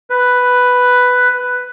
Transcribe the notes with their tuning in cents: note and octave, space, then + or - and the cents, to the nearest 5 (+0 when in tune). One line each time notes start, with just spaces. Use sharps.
B4 +5